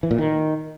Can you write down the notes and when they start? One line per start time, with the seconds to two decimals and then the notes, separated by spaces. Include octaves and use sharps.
0.03 E3
0.11 A#2
0.18 D#3